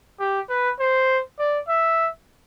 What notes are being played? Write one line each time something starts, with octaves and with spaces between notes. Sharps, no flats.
G4
B4
C5
D5
E5